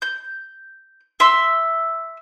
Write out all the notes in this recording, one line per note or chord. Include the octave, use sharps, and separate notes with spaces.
G6
E5 C6 E6